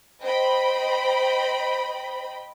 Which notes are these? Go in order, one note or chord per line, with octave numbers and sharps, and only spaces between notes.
C5 D#5 G5 B5